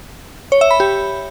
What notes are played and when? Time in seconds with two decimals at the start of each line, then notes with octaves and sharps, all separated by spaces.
0.52 C#5
0.61 E5
0.71 B5
0.80 G4